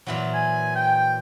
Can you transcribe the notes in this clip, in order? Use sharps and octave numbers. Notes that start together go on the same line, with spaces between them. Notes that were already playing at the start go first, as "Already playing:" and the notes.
A#2 E3 F#3
G#5
G5